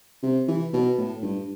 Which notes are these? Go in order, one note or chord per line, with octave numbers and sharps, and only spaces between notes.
C3
E3
B2
A2
G2